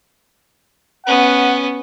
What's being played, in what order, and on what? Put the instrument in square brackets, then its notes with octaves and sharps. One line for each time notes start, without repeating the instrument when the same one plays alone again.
[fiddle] B3 C#4 [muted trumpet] F#5